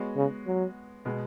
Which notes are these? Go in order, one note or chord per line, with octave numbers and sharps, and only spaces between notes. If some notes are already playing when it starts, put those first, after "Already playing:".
Already playing: G#3 B3 F#4 C#5
C#3
F#3
B2 G#3 B3